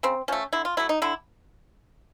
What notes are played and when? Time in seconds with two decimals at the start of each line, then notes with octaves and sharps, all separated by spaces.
0.03 C#3 C4
0.28 F3 A3 C#4
0.53 D3 E4
0.65 F4
0.77 F#3 A3 E4
0.89 D#4
1.02 D3 E4